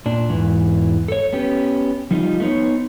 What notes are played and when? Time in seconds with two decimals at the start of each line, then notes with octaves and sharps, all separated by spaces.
0.06 A#2 D4
0.29 E2 G#2 E3
1.08 A4 C#5
1.33 B3 C#4 G4
2.11 F3 G3 D#4 F4
2.40 A3 B3 D#4 C5 C#5